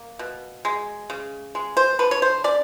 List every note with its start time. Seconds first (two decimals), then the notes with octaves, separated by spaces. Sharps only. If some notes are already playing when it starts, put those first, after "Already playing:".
Already playing: A#3
0.19 B2
0.65 G#3
1.10 C#3
1.55 G#3
1.77 C5
1.99 D3 B4
2.11 C#5
2.22 C5
2.44 C#4 D5